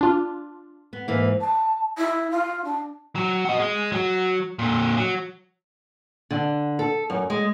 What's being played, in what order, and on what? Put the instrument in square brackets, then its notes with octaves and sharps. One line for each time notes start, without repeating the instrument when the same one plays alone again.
[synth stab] D4 F4
[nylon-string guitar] B3
G#2 E3 A#3
[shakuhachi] A5
E4
F4
D4
[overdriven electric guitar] F#3
F#4 D#5
G#3
F#3
A#2 D3
F#3
[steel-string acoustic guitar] D3
A4
F#2
G#3